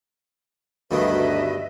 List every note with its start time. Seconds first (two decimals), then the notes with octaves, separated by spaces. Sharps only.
0.91 D2 G2 B2 D#3 B4 D#5 E5